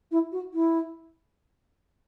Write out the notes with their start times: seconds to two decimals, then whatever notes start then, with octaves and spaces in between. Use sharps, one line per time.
0.11 E4
0.32 F#4
0.53 E4